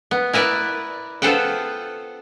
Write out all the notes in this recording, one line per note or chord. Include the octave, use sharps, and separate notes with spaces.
B3
E4 A#4 B4 D5
B3 F4 A4 C5 F#5 G5